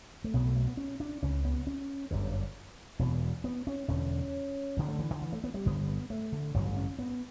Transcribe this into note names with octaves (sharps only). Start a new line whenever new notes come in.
A3
B1 B2 B3
A3
A3
B3
C#4
D4
C#2 C#3 C#4
B3
C#4
G1 F#2 D3
E1 E2 B2
B3
C#4
E1 E2 D3 C#4
D2 D3
A3
E3
D3
E3
A3
B3
G3
G1 G2 D3 B3
B3
A3
D3
A1 G2 D3 F#3
C#4
B3